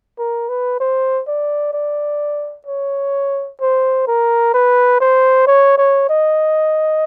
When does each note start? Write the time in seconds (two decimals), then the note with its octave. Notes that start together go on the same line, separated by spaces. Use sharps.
0.19 A#4
0.49 B4
0.80 C5
1.28 D5
1.73 D5
2.67 C#5
3.61 C5
4.07 A#4
4.54 B4
5.00 C5
5.47 C#5
5.78 C#5
6.10 D#5